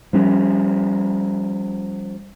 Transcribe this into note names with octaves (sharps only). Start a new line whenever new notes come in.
F3 G3 C#4